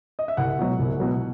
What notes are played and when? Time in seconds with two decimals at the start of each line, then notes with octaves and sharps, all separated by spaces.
0.19 D#5
0.28 E5
0.37 C2 F#5
0.59 B2 F#3
0.79 C2
1.00 B2 F#3